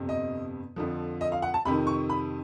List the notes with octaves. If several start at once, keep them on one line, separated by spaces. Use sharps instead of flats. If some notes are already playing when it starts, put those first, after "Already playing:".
Already playing: G1 F2 C3
D#5
F2 D3 F3
D#5
F5
F#5
A5
F2 C3 D#3 B5
C#6
B5